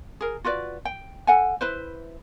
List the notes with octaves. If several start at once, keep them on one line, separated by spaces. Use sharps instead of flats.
G#4 A#4
F4 F#4 B4 D5
G5
A4 F#5 G#5
E4 B4 C5